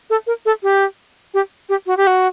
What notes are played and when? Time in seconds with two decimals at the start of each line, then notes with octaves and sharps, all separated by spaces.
0.10 A4
0.27 A#4
0.46 A4
0.63 G4
1.34 G4
1.69 G4
1.87 F#4
1.97 G4
2.07 F#4